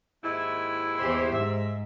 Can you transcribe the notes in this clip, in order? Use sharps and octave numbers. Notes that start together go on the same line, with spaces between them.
D#2 G#2 E4
E2 G4 C5
G#2 E5